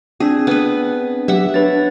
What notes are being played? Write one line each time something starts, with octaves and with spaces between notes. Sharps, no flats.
C4 D4 G#4
B3 B4
F#3 G4 E5 F#5
D4 B4 C#5 A6